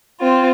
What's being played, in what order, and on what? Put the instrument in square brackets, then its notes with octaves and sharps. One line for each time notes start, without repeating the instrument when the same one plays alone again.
[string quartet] C4 F4